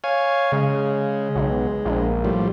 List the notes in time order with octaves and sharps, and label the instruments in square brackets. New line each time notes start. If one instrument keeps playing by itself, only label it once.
[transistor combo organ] C#5 F5 G#5
[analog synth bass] C#3 [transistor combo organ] G#3
[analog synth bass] B1
A#1
[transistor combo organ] A2 F3 G3